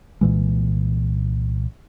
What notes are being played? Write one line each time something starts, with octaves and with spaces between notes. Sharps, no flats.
C2 A#2 E3 G#3